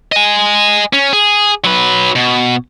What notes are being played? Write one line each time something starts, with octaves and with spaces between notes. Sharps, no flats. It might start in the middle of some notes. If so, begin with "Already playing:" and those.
D#5 G#5
C#4
G#4
F#3 B4
B2